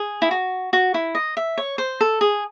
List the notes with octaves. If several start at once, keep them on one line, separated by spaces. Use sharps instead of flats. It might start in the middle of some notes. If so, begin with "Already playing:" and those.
Already playing: G#4
E4
F#4
F#4
E4
D#5
E5
C#5
C5
A4
G#4